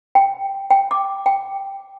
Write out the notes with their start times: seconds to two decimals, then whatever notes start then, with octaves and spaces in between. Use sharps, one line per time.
0.15 G5
0.70 G5
0.91 D6
1.26 G5